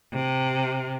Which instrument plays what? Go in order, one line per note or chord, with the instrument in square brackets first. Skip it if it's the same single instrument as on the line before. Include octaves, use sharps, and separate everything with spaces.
[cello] C3